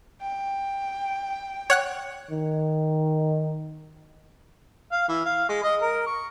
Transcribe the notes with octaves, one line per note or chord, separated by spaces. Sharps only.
G5
C#5 F#5 F#6
D#3
F5
E3
F5
G#3
D#5
A#4
C#6